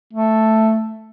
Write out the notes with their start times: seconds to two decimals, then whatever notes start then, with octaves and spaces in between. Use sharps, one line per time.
0.13 A3